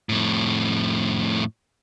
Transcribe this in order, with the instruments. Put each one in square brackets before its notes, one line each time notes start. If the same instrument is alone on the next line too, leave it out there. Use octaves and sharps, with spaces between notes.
[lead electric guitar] F2 A2